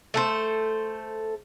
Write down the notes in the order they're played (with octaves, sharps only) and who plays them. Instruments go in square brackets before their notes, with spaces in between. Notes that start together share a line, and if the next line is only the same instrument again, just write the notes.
[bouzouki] A3 A4 C5